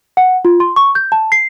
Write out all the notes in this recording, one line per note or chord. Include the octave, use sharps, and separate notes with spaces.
F#5
F4
C6
C#6
G6
A5
C7